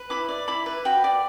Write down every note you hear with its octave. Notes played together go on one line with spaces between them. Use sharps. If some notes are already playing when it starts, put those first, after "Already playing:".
Already playing: B4
E4 B5 D6
D5
E4 B5 D6
B4
F#4 G5 B5
D5